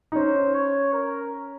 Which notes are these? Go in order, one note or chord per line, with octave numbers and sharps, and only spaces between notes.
D#4
C#4 C5
C#5
A#4